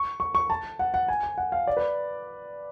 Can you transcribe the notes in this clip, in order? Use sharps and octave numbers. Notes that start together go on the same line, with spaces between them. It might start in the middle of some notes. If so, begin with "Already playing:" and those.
Already playing: C#6
C#6
C#6
A5
F#5
F#5
G#5
G#5
F#5
F5
D5
B4